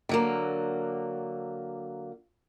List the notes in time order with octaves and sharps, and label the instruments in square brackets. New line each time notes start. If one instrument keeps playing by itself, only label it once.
[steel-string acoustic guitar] D3 F#3 A#3